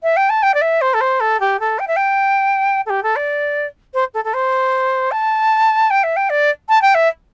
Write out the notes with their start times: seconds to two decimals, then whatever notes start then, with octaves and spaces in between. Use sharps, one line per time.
0.03 E5
0.17 G5
0.30 A5
0.43 G5
0.54 D5
0.61 E5
0.81 C5
0.94 A4
1.01 C5
1.20 A4
1.40 G4
1.60 A4
1.79 G5
1.87 E5
1.96 G5
2.86 A4
2.90 G4
3.03 A4
3.16 D5
3.94 C5
4.14 A4
4.24 A4
4.34 C5
5.11 A5
5.90 G5
6.03 E5
6.16 G5
6.30 D5
6.69 A5
6.82 G5
6.95 E5